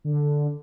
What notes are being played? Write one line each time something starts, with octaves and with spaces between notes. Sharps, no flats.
D3